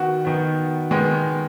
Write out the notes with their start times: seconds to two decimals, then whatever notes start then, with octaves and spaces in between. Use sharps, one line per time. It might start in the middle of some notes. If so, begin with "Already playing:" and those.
Already playing: D#3 B3 F#4
0.25 D#3 B3
0.91 D#3 G#3 B3